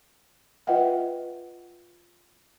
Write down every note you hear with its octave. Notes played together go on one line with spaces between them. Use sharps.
F4 B4 D#5 E5 F#5 G5